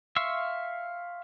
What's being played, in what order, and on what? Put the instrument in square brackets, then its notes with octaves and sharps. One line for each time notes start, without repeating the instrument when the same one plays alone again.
[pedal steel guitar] E5 F5 C6 C#6 E6